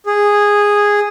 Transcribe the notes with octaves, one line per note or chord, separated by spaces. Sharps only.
G#4